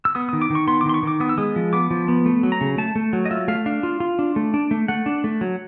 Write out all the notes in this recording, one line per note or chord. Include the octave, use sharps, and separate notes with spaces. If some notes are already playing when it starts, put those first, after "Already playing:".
E6
B3 D#6
D#6
D#3
D6
D#3 C#6
B3 C6
D6
D#3 C6
C#6
D#3 D6
B3 D#6
E6
G#3 D#6
F3
B3 D6
F3
B3
A3
F#3
A#5
C#3
A3 A5
A3
F#3
D#5
F4 E5
A3 F5
D4 F5
F4
F4
D4
A3
D4
A3
A3 F#5
D4
A3
F#3